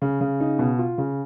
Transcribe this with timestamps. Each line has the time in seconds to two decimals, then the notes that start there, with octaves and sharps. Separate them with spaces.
0.02 C#3
0.21 C#3
0.40 D#4
0.59 B2
0.79 F4
0.98 C#3